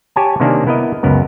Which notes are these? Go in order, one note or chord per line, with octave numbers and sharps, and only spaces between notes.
G4 C#5 G#5 A5
C3 D#3 A#3 C#4 D4
B3 E4 A#4 D#5
C#2 F#2 B3 A#4